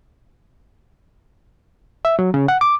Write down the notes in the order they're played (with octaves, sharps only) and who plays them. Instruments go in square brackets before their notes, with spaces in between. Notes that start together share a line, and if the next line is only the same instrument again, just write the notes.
[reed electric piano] E5
F#3
C#3
F#5
D6